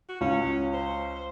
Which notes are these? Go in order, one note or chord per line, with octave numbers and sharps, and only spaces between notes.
F#4
C#2 C#4
C5